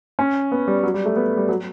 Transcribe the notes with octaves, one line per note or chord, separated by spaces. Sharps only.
C#4
B3
G3
F#3
G3
A3
B3
G3
F#3